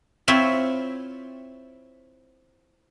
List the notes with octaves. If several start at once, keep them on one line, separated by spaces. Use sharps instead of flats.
C4 E4 F4 C#5 E5